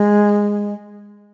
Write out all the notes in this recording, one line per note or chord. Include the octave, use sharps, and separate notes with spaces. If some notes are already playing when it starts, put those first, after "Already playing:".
Already playing: G#3